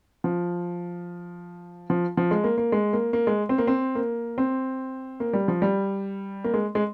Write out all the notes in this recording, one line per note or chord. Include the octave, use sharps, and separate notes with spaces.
F3
F3
F3
G#3
A#3
A#3
G#3
A#3
A#3
G#3
C4
A#3
C4
A#3
C4
A#3
G3
F3
G3
A#3
G#3
G#3